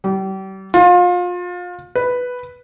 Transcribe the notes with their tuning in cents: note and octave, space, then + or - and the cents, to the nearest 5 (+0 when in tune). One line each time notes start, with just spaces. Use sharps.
G3 -35
F4 +30
B4 +0